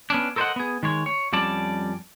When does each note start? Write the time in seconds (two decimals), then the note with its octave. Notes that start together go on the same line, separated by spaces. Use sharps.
0.10 B3 C#4 D4
0.36 A4 A#4 C5 C#5 D#5 F#5
0.56 B3 G#4
0.83 D#3 G#3 C#5
1.06 C#5
1.33 F2 G3 C#4 D5 A5